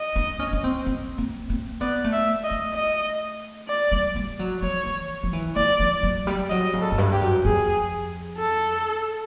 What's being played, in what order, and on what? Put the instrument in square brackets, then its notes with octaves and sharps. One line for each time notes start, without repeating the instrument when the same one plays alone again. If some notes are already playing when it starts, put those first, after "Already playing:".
Already playing: [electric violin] D#5
[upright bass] D4
C#4
C#4
C4
C4
C4
C4
[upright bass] B3 [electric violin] D5
[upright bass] A3
[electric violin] E5
D#5
[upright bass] A3
[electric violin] D#5
D5
[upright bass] G3
G3
F#3
[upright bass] F3 [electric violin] C#5
[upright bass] E3
F3
E3
[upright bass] F3 [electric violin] D5
[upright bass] F3
F#3
G3
[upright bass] F#3 [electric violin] D#5
[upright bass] C#3
[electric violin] A4
[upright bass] F#2
G2
[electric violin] G4
[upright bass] F#2
[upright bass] F2 [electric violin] G#4
[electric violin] A4